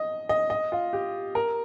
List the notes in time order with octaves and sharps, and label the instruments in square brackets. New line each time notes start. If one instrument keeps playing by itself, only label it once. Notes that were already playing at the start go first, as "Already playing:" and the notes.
Already playing: [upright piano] D#5
D#5
D#5
F4
G4
A#4